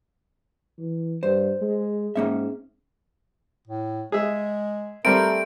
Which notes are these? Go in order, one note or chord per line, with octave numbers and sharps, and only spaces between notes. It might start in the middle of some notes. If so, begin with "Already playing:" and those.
E3
G2 C5
G#3
G#2 A#3 C#4 E5
A2
G#3 G#4 E5
G3 A3 C4 A#4 D7